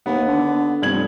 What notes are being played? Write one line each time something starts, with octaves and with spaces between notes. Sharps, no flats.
D#2 B3
D3
F1 G2 G#6 F#7